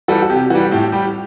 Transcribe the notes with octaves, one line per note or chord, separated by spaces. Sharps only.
E3 G3 F#4 A4
F#4
C3 G4
E3 G3 F#4
A2 G4
G3 G4